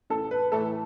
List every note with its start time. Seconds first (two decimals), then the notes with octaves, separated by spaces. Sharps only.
0.10 A1 A4
0.31 B4
0.52 A2 E3 A3 A4